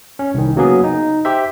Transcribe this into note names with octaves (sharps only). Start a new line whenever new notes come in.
C#4
C2 D#3
C#3 F#3 A#3 B3 G#4
D#4
G4 C5 E5